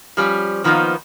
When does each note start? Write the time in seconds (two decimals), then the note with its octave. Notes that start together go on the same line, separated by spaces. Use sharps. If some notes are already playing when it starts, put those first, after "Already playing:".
0.17 F3 G3 C#4
0.64 D#3 F3 A#3 B3 D#4